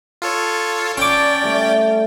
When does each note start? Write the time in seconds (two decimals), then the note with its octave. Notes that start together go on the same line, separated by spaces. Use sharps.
0.22 F4 A4 C#5
0.97 C#4 D5 G5 A5 B5 C#6 D6
1.43 G3 A3 G4